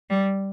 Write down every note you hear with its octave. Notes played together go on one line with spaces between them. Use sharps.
G3